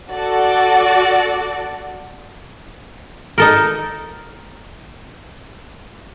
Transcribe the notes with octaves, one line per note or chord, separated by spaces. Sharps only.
F#4 A4 D5
D#4 A4 A#4